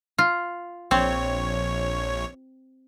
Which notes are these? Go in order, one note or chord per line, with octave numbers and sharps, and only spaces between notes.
F4
A#1 C4 C#5